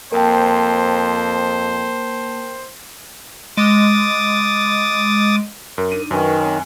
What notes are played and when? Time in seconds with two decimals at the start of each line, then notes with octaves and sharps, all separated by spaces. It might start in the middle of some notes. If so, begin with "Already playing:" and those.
0.12 F2 A#3 A#4 C5 G5 A5
3.57 G#3 D6 D#6 A6
5.78 F#2 A#4
5.92 D4 D#4 D#7
6.11 F#2 D#3 A#4 B4 G#5 C#6
6.41 C4 C#5